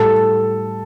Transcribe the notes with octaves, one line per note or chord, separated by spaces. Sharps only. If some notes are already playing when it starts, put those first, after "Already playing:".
Already playing: A2 G3 A4